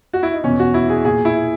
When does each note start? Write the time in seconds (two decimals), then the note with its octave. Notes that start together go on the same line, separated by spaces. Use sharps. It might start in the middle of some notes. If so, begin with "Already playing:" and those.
0.13 F#4
0.23 E4
0.34 D#4
0.44 E2 B2 C#4
0.59 F#4
0.74 E4
0.89 G#4
1.05 A#2 G#4
1.25 E4